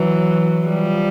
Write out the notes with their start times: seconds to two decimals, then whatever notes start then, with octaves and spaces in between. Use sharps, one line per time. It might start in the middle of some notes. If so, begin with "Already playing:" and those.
Already playing: E3 F#3
0.68 F3 G3